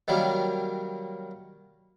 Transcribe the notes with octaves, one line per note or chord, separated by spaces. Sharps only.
D#3 F#3 G3 A#3 C#4